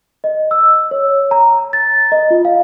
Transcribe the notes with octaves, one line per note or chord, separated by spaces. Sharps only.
D#5
E6
C#5
A#5
A6
D#5
F4
F5